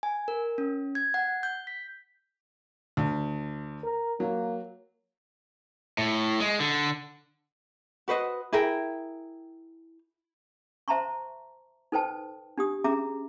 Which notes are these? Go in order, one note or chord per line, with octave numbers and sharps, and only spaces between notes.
G#5
A#4
C#4
G#6
F#5
G6
B6
D2
A#4
F#3 A#3
A2
G#3
D3
F#4 B4 C5 D#5
E4 G#4 A#4 G5
C5 E5 A5 A#5 C6 C#6
D#4 A4 B4 C5 G5 A5
D4 G4 D#6
C#4 G#4 E5 A#5 D6